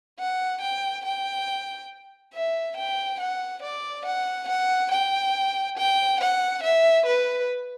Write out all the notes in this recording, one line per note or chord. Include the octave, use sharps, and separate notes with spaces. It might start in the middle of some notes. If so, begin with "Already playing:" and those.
F#5
G5
G5
E5
G5
F#5
D5
F#5
F#5
G5
G5
F#5
E5
B4